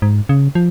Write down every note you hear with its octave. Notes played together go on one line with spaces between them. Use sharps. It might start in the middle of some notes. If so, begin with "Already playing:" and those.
G#2
C#3
F3